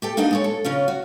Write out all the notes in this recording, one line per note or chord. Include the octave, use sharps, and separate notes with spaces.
G4 A4 G5
A#3 D4 D#4 D#5 F#5
G#3 A4 C#5
A4
C#3 C#4 F4
F#4